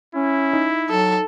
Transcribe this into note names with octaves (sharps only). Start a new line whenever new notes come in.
C#4 E4
D#4
F#3 A4